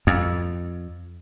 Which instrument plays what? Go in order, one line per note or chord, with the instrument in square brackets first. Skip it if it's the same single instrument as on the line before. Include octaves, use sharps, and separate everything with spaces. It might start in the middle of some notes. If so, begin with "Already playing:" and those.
[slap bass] F2